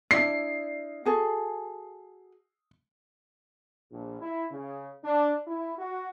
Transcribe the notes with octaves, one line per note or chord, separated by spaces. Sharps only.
D4 E4 D5 C7
F#4 G#4 A4
A#1
E4
C#3
D4
E4
F#4